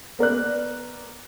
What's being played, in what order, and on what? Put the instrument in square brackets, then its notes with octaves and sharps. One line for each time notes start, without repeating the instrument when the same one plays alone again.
[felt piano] B3 A#4 D5 F#6